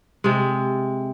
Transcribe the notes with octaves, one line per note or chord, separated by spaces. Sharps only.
C3 G#3